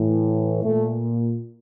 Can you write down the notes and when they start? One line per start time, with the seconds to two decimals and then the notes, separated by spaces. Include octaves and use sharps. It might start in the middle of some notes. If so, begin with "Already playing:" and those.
Already playing: A2 E3
0.64 A#2 A3